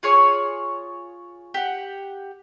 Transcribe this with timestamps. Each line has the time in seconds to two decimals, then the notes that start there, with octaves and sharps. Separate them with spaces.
0.03 F4 G#4 C#5 C#6
1.54 G4 F#5